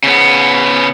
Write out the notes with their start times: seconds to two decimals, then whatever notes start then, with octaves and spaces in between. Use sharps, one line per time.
0.04 C#3 B3